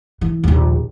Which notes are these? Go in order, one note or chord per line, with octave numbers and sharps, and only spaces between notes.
E3
A#1 D#2